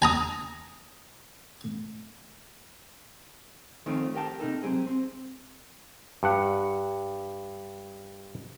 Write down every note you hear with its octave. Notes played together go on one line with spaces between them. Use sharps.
G#5 A#5 D#6
D#3 F3 A3 C4 C#4
G4 A#4 G5 A5
C3 A#3 D#4 A4
F#3 G#3 C4 G4 G#4
C4
G2 F#5